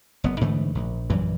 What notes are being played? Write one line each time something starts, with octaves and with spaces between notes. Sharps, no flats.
F#1 B3
G#2 D3 E3 A3
A#1
A#1 F#2 E3 G3